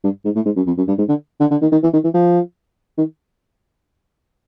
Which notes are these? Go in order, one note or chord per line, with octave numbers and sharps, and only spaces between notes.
G2
G#2
A2
G#2
F#2
F2
F#2
G2
G#2
D3
D3
D3
D#3
D#3
E3
D#3
E3
F3
D#3